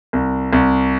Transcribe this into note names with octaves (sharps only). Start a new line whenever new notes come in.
C2
C2